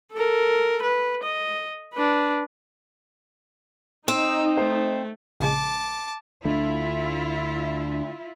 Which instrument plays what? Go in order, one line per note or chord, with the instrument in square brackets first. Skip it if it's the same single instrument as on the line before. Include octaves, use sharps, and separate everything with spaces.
[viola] A4 A#4
B4
D#5
D4 B4
[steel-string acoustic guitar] C4 [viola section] D#4 [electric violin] E6
[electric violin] A3 [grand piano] C5
[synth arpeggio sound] A#1 C#3 G#3 [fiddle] A5 D6
[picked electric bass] D2 D3 A3 [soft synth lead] D4 [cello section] E4 F4 E5